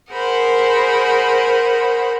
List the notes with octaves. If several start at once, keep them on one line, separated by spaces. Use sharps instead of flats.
G#4 A#4 C5 F#5 B5